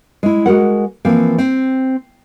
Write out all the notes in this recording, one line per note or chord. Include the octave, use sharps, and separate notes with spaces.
G#3 E4
G#3 F#4 A#4 F#5
E3 F3 A#3 C4
C4